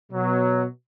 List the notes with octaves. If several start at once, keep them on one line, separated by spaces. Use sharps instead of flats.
B2 F#3